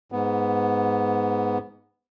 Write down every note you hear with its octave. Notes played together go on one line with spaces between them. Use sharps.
G#2 B3